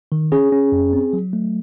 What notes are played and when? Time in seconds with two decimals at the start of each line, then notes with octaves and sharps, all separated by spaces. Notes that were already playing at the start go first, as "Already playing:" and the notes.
0.12 D#3
0.32 C#4 G#4
0.52 C#4
0.72 F#2
0.93 C4
1.13 F#3
1.33 A3